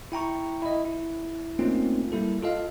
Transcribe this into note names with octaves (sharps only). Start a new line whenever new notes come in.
E4 G5 A#5 C#6
E4 D#5
E4
A3 A#3 C4 C#4 D#4 F4
G3 A#3 E4 A4
F4 A4 D#5 F5